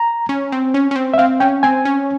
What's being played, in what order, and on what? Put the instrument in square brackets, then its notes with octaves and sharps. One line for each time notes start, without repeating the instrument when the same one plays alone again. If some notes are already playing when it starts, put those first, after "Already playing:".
Already playing: [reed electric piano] A#5
[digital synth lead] C#4
C4
C#4
C#4
C4
[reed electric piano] E5
[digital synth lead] C4 [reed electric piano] F5
[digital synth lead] C#4 [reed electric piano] G5
[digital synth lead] C4 [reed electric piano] G#5
[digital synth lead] C#4